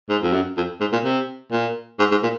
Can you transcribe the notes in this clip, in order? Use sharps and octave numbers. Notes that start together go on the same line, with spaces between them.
G#2
F2
F#2
F2
G#2
A#2
C3
A#2
G#2
G#2
A#2